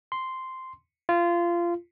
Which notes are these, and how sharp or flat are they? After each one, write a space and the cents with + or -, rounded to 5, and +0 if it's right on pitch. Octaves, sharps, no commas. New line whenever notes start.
C6 -5
F4 -20